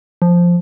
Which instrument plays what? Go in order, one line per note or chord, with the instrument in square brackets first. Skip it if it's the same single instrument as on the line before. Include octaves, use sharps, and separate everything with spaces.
[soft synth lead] F3